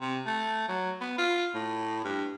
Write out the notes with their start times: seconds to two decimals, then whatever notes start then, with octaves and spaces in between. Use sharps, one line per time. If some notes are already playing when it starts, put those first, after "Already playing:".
0.01 C3
0.26 A3
0.68 F#3
1.01 B3
1.18 F4
1.55 A2
2.04 G2